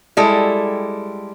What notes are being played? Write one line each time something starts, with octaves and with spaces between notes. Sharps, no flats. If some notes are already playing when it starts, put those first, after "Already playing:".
G3 G#3 E4 A4